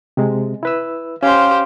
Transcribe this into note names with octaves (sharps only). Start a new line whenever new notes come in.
C3 G#3
E4 B4 E6
C#4 G4 C5 F5